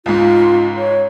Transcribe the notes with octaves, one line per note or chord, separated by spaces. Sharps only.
C#2 G#2 F4
C#5